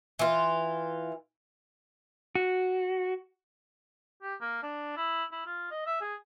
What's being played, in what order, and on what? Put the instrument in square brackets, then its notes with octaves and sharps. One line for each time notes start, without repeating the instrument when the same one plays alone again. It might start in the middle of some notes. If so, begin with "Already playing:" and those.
[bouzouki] E3 F4
[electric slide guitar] F#4
[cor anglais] G4
A#3
D4
E4
E4
F4
D#5
E5
G#4